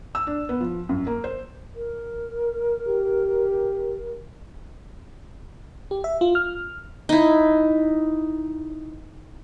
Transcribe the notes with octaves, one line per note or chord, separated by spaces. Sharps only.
E6
D4
B3
F3
F#2
A#3
C5
A#4
G4
G4
E5
F4
F6
D#4 E4